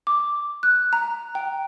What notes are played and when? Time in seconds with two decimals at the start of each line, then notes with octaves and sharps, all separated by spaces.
0.07 D6
0.63 F#6
0.93 A#5
1.35 G5